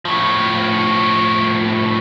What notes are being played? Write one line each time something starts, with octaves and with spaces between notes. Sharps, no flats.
A2 F3